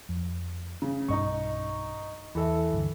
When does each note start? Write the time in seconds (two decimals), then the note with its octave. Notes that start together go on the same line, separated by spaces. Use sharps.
0.09 F2
0.82 C#3
1.08 B1 G2 D#4 D#5 C#6
2.35 E2 E3 A4 E5
2.73 D2 G2 D3